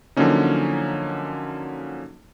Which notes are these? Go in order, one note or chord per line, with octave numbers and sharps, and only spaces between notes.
D3 F3 F#3 A#3 C#4 D#4